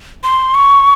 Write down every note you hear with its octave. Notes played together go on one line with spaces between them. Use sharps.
C6
C#6